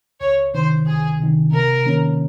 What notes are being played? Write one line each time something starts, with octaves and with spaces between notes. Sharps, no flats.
C#2 C#5
C3 D#3 C5
C#2 G#4
C3 D#3
C3 A#4
D#3 A#3 C#4